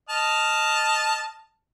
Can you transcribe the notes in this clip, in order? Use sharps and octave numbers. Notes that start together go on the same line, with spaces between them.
D#5 A5 F6